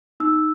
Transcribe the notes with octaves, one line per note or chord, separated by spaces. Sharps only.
D#4 E6